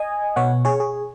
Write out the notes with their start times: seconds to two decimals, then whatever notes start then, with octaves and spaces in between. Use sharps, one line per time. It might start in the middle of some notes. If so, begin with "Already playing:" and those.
Already playing: D#5 G#5
0.36 B2 B3 C#5 F#5
0.65 G#4 C#5
0.80 G#4